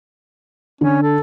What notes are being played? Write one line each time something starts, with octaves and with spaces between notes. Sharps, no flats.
D3 C#4
A4